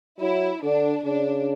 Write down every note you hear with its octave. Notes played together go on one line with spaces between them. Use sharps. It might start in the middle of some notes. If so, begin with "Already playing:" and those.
F#3 E4
D3 D4
C#3 D4